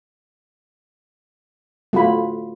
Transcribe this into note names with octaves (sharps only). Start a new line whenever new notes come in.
A3 F4 F#4 B5